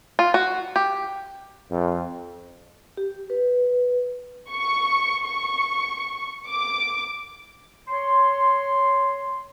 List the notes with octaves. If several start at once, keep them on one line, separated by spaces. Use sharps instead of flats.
F4
F#4
G4
F2
G4
B4
C#6
C#6
D6
C#5 C6